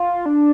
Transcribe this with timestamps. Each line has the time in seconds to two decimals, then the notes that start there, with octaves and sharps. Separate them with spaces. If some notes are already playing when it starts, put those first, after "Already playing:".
Already playing: F4
0.26 D4